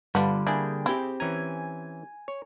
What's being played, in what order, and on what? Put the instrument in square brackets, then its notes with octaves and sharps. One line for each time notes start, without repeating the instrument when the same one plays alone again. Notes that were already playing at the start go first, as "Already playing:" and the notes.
[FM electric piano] G2 F4 [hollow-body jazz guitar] D3 G3 [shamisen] B3 D4
[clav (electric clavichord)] A#3 D4 [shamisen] E4 [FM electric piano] G#4 G5
[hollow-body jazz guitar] C4 G4 [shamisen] E4
[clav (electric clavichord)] E3 C#4 A#5 [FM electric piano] G#5
[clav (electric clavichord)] C#5